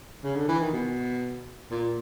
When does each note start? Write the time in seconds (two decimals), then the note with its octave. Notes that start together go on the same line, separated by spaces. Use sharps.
0.23 C#3
0.35 D3
0.48 E3
0.60 D#3
0.73 B2
1.71 A#2